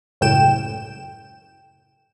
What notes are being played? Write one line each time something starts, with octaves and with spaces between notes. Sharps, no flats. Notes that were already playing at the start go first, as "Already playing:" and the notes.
C#2 F#2 A2 G5 E7